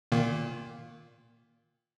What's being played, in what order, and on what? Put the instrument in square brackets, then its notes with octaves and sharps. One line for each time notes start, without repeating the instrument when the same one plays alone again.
[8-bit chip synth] A#2 D#3 A#3